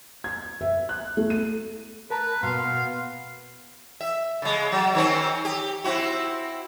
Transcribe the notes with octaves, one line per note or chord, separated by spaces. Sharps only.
G#6
E5
F#6
A3
D#7
A#4 B4 A5 A#5
B2 B3 F5 C6
E5
C#3 G#3
F#3
D#3 C4 C#4
G4
C4 E4 F#4